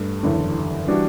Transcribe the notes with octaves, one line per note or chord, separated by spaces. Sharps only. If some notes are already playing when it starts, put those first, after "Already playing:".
Already playing: G2 A3
F#1 E2 D3
E3 G3 D4 F#4